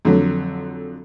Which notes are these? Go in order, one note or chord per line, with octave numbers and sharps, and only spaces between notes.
F2 D3 F#3